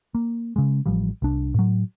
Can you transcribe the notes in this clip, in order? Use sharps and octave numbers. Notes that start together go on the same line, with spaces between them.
A#3
C#3 G#3
A1 F3 G3
C2 D4
A2 F#3